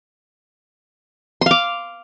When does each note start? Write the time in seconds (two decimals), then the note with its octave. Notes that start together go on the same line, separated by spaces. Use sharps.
1.41 C6
1.46 F5
1.51 D6